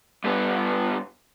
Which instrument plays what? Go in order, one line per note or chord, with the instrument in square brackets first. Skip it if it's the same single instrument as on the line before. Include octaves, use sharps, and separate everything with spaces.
[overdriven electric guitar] G2 B3